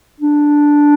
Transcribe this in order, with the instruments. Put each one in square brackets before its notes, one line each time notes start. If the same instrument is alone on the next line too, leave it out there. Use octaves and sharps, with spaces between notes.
[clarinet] D4